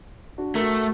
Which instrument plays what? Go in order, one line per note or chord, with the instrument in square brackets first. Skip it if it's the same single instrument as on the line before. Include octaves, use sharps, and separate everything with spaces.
[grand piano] D4 F#4
[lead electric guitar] A3 [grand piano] F#4 A#4